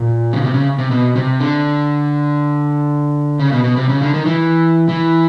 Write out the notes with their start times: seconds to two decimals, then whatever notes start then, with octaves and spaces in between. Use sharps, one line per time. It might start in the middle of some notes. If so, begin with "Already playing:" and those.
Already playing: A#2
0.33 C#3
0.42 C3
0.54 C#3
0.79 C3
0.91 B2
1.16 C3
1.40 D3
3.39 C#3
3.52 B2
3.64 B2
3.77 C3
3.89 C#3
4.02 D3
4.14 D#3
4.26 E3
4.89 E3